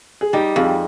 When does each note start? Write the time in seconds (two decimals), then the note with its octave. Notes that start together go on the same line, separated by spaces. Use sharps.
0.21 G#4
0.33 G3 D#4 G4
0.56 F2 F4 G#4